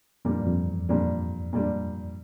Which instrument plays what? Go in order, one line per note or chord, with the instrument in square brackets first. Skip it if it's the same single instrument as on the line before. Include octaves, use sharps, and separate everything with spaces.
[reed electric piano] F2 [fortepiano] A#2 G3 D4
[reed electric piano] G2
F2
E2
[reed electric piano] F2 [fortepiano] A#2 G3 D4
[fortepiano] A#2 G3 D4